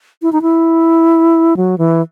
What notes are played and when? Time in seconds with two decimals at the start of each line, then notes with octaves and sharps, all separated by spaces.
0.22 E4
0.33 D#4
0.42 E4
1.57 F#3
1.78 E3